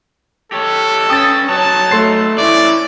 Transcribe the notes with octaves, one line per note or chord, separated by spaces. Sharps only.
G4 A4 C#5
C#4 B4 G5 D#6 A6
F#3 D#4 C#5 A5
A3 A4 C6 C7
E3 C#4 E4 D5